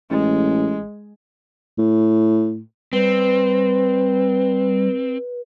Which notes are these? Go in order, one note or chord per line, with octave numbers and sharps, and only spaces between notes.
A1 G#3
A2
G3 C4 B4